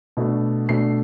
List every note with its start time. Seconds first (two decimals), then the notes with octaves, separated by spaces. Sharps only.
0.17 B2 A3 D4
0.69 B2 A3 D4 C7